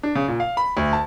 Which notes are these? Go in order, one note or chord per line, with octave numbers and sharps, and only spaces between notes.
D4
C#3
A#2
F5
B5
D2
A5